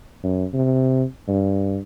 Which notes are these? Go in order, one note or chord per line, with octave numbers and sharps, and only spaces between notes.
F#2
C3
G2